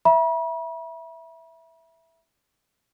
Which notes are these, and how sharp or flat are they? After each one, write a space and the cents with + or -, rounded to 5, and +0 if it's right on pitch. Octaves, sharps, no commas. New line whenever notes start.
E5 +0 B5 -45